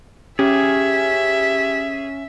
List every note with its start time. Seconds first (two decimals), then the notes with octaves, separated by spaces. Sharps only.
0.39 C#4 G4 G#4 E5